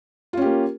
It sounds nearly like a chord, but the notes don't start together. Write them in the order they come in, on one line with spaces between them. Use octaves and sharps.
F4 C#4 G4 A#3